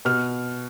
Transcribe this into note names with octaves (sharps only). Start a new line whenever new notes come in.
B2 F6